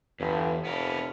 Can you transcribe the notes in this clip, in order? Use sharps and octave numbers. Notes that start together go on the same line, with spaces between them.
G1 E2
F1 B3 A#4